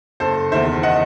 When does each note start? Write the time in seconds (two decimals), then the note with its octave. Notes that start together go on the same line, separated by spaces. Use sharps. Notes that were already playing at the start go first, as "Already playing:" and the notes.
0.20 F#1 A4 C5
0.52 E2 D#3 C5 E5
0.83 D#5 F#5